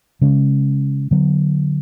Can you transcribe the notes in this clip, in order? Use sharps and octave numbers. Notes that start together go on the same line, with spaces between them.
C#3 G#3 C#4
D3 F#3 B3